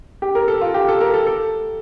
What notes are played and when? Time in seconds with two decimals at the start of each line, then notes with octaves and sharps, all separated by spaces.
0.22 G4
0.35 A#4
0.48 A4
0.61 F4
0.74 G4
0.89 A4
1.01 A#4
1.14 A4
1.27 A4